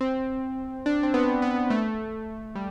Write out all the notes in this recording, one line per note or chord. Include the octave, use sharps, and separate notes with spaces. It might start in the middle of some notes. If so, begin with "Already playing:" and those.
C4
D4
C4
B3
B3
A3
G3